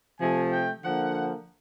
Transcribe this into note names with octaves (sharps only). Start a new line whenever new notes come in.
C3 F3 A3 G#5
G5
D3 F3 A#3 F#5